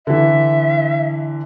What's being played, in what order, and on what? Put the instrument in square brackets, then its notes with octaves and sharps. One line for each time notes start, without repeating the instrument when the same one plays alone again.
[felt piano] D3 E3 [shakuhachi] E5